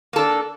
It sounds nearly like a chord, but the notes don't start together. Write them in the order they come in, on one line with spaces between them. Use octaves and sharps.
A#3 A4 D4